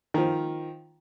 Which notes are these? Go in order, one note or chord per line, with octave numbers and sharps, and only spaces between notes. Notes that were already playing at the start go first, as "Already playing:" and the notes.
D#3 F3